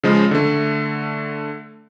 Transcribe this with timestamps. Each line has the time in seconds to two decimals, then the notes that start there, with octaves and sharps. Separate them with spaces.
0.03 C#3 F3 G#3 C#4
0.31 D3 A3